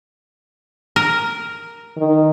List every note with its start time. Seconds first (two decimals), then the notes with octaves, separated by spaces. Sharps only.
0.96 A#4
1.97 D#3